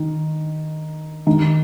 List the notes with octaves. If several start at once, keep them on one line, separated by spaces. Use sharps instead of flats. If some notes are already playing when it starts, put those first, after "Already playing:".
Already playing: D#3
D#3